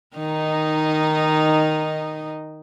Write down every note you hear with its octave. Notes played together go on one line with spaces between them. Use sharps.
D#3 D#4 D#5